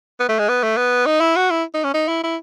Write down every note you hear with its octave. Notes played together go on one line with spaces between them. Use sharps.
B3
A3
G#3
B3
A3
B3
D#4
E4
F#4
E4
D#4
C#4
D#4
E4
E4